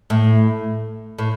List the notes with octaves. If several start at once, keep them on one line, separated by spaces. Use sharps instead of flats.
A2
A2